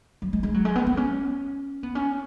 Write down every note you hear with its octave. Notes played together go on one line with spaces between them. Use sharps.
F#3
G#3
G#3
F#3
G#3
B3
B3
C#4
B3
C#4